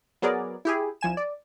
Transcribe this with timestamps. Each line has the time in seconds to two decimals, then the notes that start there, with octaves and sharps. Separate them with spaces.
0.22 F#3 B3 G#4 A#4 D5
0.65 E4 G4 G#4
1.01 C2 F3 G#5 E7
1.17 D5